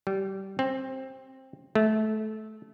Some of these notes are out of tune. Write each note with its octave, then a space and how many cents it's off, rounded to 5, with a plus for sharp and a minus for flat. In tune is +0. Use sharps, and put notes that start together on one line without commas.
G3 -20
C4 +15
A3 -20